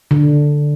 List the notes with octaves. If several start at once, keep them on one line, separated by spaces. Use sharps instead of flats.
D3